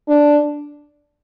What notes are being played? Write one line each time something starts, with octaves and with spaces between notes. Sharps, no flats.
D4